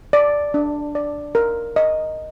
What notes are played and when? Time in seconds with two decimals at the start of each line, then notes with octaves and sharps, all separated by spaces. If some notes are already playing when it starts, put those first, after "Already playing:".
0.13 D5
0.54 D4
0.95 D5
1.35 A#4
1.76 D#5